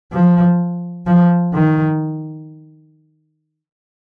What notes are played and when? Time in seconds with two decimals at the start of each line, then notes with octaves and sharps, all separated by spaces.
0.12 F3
1.07 F3
1.54 D#3